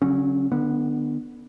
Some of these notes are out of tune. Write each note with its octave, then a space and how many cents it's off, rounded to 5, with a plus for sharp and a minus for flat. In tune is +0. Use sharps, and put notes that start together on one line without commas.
D3 -45 F#3 +15 C#4 -20
D3 +25 B3 -10